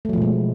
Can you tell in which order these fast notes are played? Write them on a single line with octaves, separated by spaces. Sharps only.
A3 F#3 F3 B2 G#3